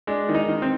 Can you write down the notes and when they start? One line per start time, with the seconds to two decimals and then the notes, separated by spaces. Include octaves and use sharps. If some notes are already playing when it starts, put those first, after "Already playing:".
0.07 G#3 D4
0.29 D#3
0.35 D#4
0.48 D#3
0.62 C4